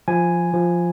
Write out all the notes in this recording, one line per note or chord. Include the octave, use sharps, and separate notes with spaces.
F3 G#5
F3